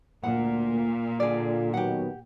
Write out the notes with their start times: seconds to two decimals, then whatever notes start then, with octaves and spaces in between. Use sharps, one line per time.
0.24 D2 A#2 A#3 F#5
1.20 D3 D4 F4 G#4 D5
1.74 B2 D#3 F#3 G4 F#5